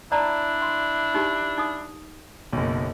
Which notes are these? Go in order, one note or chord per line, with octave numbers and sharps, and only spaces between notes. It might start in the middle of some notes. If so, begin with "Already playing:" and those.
D4 E4 D5 A5 A#5
C6
D#4 G4
D#4 D#6
F#1 B1